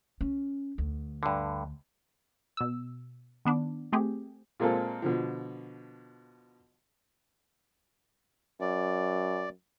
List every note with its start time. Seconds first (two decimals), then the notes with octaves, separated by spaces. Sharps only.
0.21 C#4
0.78 D2
1.23 G2 D3
2.57 B2 E6
3.45 D#3 B3 D4
3.92 A3 C4 G4 G#4
4.60 A#2 G#3 A#3 C4 F4 A4
5.02 B2 D3 F3
8.61 F#2 D5